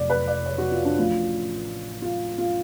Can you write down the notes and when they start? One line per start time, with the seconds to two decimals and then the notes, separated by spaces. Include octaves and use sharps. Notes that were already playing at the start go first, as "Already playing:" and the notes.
Already playing: F1 F2 F3 D5
0.10 B4
0.28 D5
0.46 C#5
0.58 F#4
0.72 F4
0.85 D4
0.97 A1 A2 F3 F4
2.02 F4
2.38 F4